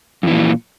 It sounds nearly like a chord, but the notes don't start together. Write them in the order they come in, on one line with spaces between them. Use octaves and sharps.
F2 E3 A#2